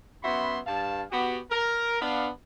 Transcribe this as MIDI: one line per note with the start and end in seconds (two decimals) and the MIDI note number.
0.23 0.58 42
0.23 0.58 59
0.23 0.58 66
0.23 0.58 76
0.23 0.58 83
0.23 0.58 84
0.66 1.02 43
0.66 1.02 77
0.66 1.02 81
1.11 1.39 59
1.11 1.39 66
1.11 1.39 67
1.51 1.99 70
2.01 2.29 59
2.01 2.29 62
2.01 2.29 77